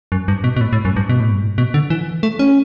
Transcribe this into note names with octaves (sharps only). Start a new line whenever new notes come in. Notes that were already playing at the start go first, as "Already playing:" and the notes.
F#2
G2
B2
B2
A2
A2
F#2
G2
B2
A2
G2
A2
B2
D3
E3
A3
C#4